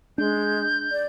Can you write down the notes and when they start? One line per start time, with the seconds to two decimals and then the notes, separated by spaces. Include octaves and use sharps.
0.18 G#3 D4 G6
0.91 D5